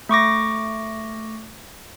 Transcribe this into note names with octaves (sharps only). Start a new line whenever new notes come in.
A3 C#6 D6 A#6